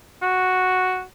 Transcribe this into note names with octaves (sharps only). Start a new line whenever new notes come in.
F#4